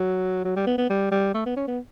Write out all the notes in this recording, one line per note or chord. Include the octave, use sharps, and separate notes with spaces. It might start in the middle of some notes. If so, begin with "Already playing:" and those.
Already playing: F#3
F#3
G3
B3
B3
G3
G3
A3
B3
C#4
B3